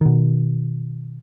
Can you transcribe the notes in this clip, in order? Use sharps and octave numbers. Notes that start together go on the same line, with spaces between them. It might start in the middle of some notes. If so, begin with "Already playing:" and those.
B2 D#3